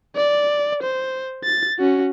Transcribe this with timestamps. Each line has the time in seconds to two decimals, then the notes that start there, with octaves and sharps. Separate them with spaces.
0.16 D5
0.83 C5
1.44 A6
1.79 C#4 F#4